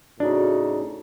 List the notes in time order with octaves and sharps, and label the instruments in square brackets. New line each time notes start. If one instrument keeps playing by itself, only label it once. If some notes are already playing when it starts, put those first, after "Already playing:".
[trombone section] A2 C#3 D#4 [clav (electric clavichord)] D4 [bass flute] F#4